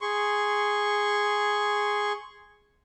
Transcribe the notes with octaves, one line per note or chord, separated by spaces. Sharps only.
G#4 C6 C#6